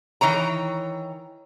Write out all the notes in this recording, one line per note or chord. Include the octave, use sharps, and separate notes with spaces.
D#3 E3 C#5 A#5